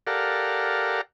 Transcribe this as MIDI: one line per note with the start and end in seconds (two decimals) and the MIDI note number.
0.07 1.01 67
0.07 1.01 69
0.07 1.01 70
0.07 1.01 74
0.07 1.01 77
0.07 1.01 78